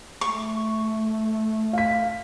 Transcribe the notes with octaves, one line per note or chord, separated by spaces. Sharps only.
A3 C#6
F5 B6